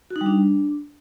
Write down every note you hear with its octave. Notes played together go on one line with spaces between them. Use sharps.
F#4
D#4
G3
D4